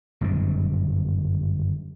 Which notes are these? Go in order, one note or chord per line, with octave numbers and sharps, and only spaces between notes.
G1 F#2 A#2 D#3